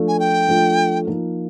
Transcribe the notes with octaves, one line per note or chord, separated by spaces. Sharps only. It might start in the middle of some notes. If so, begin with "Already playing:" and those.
Already playing: F3 A3 D4 F4 A4
G#5
G5
F3 A3 D4 F4 A4
F3 A#3 D#4